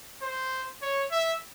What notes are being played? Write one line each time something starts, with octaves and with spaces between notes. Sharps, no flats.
C5
C#5
E5